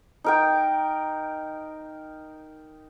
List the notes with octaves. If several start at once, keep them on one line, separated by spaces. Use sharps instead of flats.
D#4 A#4 G5